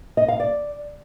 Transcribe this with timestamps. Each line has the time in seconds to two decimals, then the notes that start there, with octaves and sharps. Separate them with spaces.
0.17 D#5
0.28 F5
0.40 D5